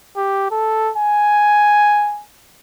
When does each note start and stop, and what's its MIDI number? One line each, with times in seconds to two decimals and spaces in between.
0.16 0.48 67
0.51 0.91 69
0.97 2.22 80